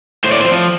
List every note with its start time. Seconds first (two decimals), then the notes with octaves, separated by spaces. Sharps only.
0.24 A2 C5
0.32 D5
0.41 C4 C5
0.45 F3